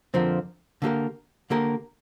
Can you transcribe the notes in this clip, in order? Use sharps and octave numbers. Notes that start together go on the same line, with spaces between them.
F2 D3 F3 C4 A#4
D3 A#3 G4 A#4
D3 A#3 G4 A#4